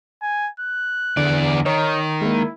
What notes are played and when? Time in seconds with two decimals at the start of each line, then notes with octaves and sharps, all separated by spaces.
0.22 G#5
0.60 F#6
1.17 E2 D3 D5
1.66 D#3 C#5 D#5
2.21 G#3 A#3 E4